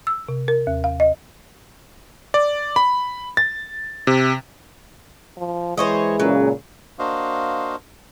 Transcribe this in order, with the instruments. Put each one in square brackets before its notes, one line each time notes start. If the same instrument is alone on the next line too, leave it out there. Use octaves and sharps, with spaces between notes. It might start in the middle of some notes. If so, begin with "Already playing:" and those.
[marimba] E6
C3
A#4
D#2
F5
D#5
[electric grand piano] D5
B5
A6
C3
[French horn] F3
[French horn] E3 [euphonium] G#3 [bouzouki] C5 C#5 D#5
[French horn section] A#2 C#3 [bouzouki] F#3
[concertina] A#3 D4 F#4 C5 D#5 F5